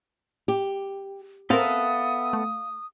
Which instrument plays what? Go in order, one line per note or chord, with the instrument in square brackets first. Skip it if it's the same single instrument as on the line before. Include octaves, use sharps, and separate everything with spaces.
[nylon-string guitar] G4
[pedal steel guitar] B3 A4 E5 [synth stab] C4 A#4 [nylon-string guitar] F5 [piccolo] D#6
[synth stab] A3